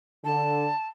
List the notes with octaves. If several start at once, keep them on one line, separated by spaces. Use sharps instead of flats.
D3 A5